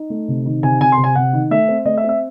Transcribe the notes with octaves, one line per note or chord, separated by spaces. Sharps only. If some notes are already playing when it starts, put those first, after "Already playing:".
Already playing: D#4
A3
C3
D#3
C3 G#5
C3 G#5
C6
C3
G#5
C3 F#5
D#3
A3 E5
C4
A3 D#5
E5
C4
E5